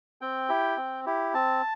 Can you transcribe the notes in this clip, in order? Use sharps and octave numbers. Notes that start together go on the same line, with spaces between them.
C4 G5
E4 G4
C4
E4 G4
C4 A5